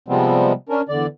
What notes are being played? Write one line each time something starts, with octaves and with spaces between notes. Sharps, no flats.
C3 F3 G3 G#3 B3 C4
C#4 D4 A#4
E2 D3 D5